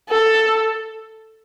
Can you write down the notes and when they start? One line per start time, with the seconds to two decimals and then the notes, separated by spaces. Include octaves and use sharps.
0.09 A4